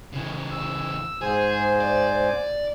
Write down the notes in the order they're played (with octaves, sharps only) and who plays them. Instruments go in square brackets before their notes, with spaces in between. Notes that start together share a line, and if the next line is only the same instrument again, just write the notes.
[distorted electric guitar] C#3 E3
[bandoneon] E6
[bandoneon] G#2 C5 G#5 [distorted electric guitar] G#4
[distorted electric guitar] D5